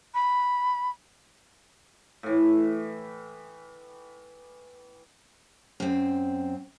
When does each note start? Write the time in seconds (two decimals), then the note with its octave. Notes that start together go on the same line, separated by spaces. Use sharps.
0.14 B5
2.23 A2 E3
5.80 F#2 C4